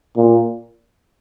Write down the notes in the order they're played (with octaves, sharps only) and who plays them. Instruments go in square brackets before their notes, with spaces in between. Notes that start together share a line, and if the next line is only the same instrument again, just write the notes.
[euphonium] A#2